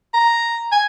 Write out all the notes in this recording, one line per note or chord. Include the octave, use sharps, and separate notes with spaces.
A#5
G#5